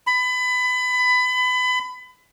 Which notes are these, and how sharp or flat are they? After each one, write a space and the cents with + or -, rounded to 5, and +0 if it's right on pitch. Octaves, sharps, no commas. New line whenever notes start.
B5 +25